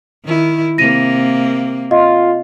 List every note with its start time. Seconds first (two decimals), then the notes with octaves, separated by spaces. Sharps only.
0.25 D#3 E4
0.78 C3 A#3 A#6 D#7
1.91 F4 D#5